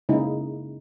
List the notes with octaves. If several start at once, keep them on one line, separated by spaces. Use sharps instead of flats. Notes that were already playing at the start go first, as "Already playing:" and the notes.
C#3 G#3 A#3 D#4 E4